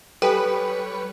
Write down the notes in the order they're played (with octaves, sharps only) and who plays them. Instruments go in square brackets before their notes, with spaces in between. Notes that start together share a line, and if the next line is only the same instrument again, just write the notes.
[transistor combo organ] G3 C#5 [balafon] G4 G5 [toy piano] A4 G#5 [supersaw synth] B4